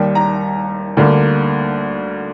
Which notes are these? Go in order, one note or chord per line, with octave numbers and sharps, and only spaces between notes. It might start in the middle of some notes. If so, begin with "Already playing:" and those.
Already playing: D#2 D#3 G3
A#5
D2 D3 G3 A#3